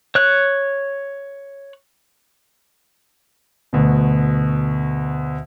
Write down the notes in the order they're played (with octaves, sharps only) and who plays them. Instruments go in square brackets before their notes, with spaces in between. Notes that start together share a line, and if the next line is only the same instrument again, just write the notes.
[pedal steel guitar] C#5 F#6
[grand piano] D2 B2